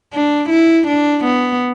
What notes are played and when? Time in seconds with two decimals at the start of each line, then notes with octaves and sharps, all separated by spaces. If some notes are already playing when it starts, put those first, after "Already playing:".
0.13 D4
0.50 E4
0.87 D4
1.25 B3